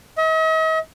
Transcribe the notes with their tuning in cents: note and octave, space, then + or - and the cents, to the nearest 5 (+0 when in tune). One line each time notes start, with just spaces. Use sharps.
D#5 +45